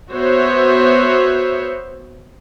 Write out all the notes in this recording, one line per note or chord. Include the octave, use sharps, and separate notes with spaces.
B3 F#4 C5 C#5 E5